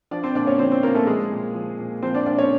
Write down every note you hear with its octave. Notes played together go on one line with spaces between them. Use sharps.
F3 D4 D5
C4 C5
A#2 D4 D5
C#4 C#5
F3 C4 C5
C4 C5
A#2 A#3 A#4
A3 A4
F3 G#3 G#4
A#2
F3
A#2
F3 C4 C5
D4 D5
A#2 D4 D5
C#4 C#5